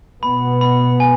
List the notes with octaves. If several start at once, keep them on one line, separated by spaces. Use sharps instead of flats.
B2 B3 B5
B5
G#5